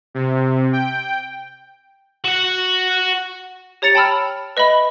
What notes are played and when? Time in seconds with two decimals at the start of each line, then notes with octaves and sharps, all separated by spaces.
0.14 C3
0.73 G5
2.24 F#4 F#5
3.82 G4 C#5 A#5 A6 C#7 F7
3.95 G5 A5 B5 E6 F6
4.57 B4 D#5 E5 B5